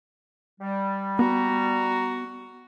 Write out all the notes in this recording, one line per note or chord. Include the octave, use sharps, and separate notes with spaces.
G3
B3 F#4 A#5